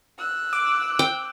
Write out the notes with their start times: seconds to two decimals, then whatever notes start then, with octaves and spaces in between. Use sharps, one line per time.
0.18 E6 F#6
0.53 D6
0.99 G5